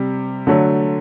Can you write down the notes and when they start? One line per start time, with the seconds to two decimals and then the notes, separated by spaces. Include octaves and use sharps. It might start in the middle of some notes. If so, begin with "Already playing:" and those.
Already playing: C3 G3
0.47 D3 F#3 A3